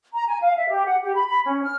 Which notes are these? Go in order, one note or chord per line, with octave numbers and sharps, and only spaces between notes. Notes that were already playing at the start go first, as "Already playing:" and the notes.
A#5
G#5
F5
E5
G4
F#5
G4
B5
B5
C#4
F6